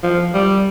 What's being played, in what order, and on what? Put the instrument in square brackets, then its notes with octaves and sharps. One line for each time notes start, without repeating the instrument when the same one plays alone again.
[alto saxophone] F3
G3